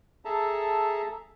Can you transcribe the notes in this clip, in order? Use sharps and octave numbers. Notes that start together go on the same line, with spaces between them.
G#4 A4 E5 A5 A#5